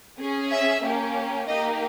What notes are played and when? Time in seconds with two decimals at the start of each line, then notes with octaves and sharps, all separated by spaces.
0.19 C#4 G#4
0.50 E5
0.83 A#3 C#4 G4
1.47 A#3 D#4 G4 D#5